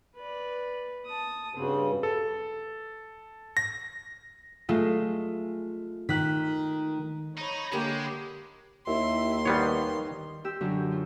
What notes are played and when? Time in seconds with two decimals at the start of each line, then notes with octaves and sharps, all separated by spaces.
0.15 B4 D5
1.06 A5 D#6
1.55 G2 C#3 C4 F#4
2.03 A4
3.57 A#6
4.69 G#3 A3 F4
6.09 D#3 F#6 B6
7.37 D#4 C#5 B5
7.72 D3 G#3 A#3 G4
8.87 D#2 E4 C6
9.45 D#3 G3 B3 C#5
10.45 G4 E6
10.61 F#2 D3 F#3 D4
10.92 F4